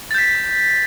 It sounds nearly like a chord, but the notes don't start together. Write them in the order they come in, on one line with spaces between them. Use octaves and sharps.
A6 G6 B6